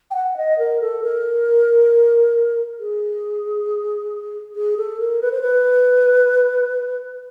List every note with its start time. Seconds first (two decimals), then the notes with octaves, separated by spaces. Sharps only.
0.10 G5
0.15 F#5
0.37 D#5
0.58 A#4
0.81 A4
1.03 A#4
2.79 G#4
4.55 G#4
4.77 A4
4.99 A#4
5.21 B4
5.31 C5
5.41 B4